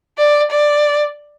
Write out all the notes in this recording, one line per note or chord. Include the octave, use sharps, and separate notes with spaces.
D5
D5